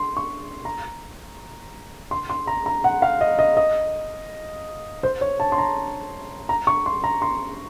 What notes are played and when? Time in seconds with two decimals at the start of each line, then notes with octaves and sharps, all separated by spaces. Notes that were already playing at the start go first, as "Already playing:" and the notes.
Already playing: C6
0.17 C#6
0.65 A#5
2.11 C6
2.30 C6
2.47 A#5
2.66 A#5
2.84 F#5
3.02 F5
3.21 D#5
3.39 D#5
3.57 D#5
5.03 C5
5.21 C#5
5.40 A5
5.52 C6
5.58 A#5
6.49 A#5
6.67 C#6
6.86 C6
7.04 A#5
7.22 C6